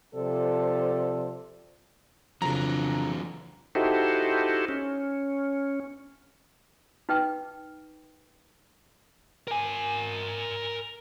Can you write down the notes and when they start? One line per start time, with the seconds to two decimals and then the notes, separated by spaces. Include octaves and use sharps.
0.15 C3 F3 A4 D5
2.42 F2 C#3 E3 F#3 D4 A#5
3.75 D#4 E4 F#4 G4 A4 C5
4.69 C#4
7.09 D#4 B4 G5
9.48 A#4 G#5